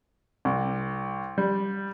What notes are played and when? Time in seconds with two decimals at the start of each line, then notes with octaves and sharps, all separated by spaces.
0.45 C2
1.38 G3